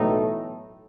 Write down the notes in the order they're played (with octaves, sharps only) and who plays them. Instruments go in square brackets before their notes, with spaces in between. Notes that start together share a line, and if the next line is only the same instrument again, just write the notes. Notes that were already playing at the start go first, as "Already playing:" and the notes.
Already playing: [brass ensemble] B1 A2 E3 A3 D#4